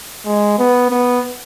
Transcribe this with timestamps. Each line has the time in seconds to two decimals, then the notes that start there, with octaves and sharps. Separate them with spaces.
0.26 G#3
0.59 B3
0.91 B3